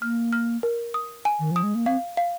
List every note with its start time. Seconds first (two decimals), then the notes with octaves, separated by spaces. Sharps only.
0.01 A#3 F6
0.33 F6
0.63 A#4
0.94 D#6
1.25 G#5
1.40 D#3
1.51 F3 D#6
1.63 G#3
1.75 A#3
1.86 C4 F5
2.17 F5